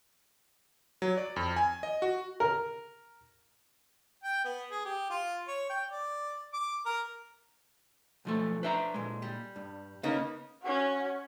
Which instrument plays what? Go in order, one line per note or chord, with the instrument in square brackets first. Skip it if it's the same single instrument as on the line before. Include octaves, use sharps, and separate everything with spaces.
[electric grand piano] F#3
D5
F2
G#5
D#5
F#4
[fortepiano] A#4
[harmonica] G5
B3
G#4
G4
F4
C#5
G5
D5
D6
A#4
[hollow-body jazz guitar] B1 F3 A3
[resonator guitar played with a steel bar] D4 C5 [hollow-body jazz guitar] B4 E5 A#5
[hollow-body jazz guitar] A#2 G#3
[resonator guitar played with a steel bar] G3
[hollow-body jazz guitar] G2
[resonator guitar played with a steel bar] C#3 A#3 D#4 [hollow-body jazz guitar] B3
[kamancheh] C#4 F#4